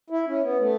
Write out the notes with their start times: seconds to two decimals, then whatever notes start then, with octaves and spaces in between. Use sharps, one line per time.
0.10 E4
0.27 C#4
0.43 B3
0.60 A3